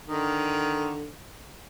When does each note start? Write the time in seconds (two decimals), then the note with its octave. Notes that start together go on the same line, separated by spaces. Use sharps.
0.07 D3 D#3